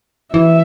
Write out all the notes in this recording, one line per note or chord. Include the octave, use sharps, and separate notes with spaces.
E3 E5